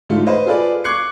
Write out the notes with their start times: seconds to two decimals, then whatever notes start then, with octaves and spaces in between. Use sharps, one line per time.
0.09 G#2 D3 A3 F4
0.26 B4 C5 D#5
0.46 F4 G#4 A4 B4 D5
0.84 C#6 D6 F#6 G#6 C7 C#7